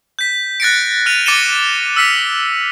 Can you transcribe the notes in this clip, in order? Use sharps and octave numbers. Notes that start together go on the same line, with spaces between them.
G6 B6
F#6 A6 A#6 C#7 D7
F6 A6 D#7 F7
D6 A6 C#7 D#7 E7 G7
E6 F6 B6 C#7 F7